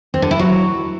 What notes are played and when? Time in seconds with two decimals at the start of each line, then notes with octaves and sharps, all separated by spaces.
0.14 C4
0.22 D3
0.31 E4
0.39 F#3